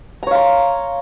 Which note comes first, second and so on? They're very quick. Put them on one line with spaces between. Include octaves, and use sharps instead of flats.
A#5 C#5 F5 C6